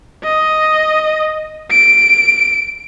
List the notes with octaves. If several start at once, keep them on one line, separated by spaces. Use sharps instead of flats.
D#5
D7